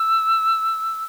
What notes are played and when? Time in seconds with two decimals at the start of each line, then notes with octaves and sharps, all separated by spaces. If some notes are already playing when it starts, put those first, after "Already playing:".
Already playing: E6